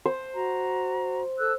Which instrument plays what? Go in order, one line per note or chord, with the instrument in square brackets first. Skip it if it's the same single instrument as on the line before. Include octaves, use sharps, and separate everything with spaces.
[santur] C5
[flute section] F#4 A#5
A4 E6 F#6